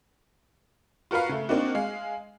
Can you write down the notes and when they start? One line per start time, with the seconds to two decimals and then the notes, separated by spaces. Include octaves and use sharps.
1.11 F4 F#4 A#4 B4 F5
1.29 C#3 A3
1.49 A#3 C4 D4 D#4 F#4
1.75 G#3 F5